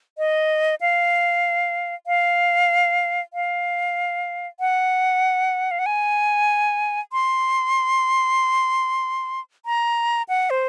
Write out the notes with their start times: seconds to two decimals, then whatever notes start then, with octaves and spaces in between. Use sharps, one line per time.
0.18 D#5
0.81 F5
2.07 F5
3.34 F5
4.60 F#5
5.71 F5
5.79 F#5
5.86 G#5
7.13 C6
9.66 A#5
10.29 F#5
10.50 C5